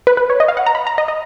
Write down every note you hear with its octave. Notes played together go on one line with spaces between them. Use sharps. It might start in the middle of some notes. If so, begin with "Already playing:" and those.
B4
B4
C#5
D#5
F5
F#5
A#5
B5
A#5
D#5
D#5